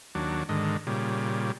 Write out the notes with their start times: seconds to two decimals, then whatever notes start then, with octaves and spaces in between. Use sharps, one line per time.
0.15 D#2 F#3 D4
0.49 G#2 D3 D#3
0.87 A#2 C#3 G3